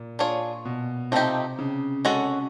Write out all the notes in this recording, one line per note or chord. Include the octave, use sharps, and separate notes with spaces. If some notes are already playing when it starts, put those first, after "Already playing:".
Already playing: A#2
D4 F4 G#4 C#5
B2
C3 F3 A3 C4 D#4 G4
C#3
G#3 C#4 F#4 A4